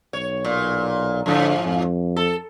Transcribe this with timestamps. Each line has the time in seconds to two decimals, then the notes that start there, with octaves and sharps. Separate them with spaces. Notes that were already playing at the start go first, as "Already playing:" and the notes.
0.13 B1 C#5
0.44 A#2
1.26 G#2 D3 F3
1.65 F2
2.16 A4